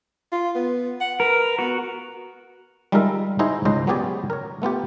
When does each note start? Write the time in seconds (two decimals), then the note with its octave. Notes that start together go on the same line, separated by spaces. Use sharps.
0.32 F4
0.55 B3
1.01 F#5
1.20 A#4 B4
1.59 B3 F#4
2.92 G3 G#3 D#4 F4 A#4 E5
3.39 D#4 E4 F#4 G#4 C5 D#5
3.65 C#2 G#2 C#3 C5 D#5
3.87 F#3 B3 C#4 G4 G#4 D5
4.30 A#4 C#5
4.62 A3 B3 F4 G4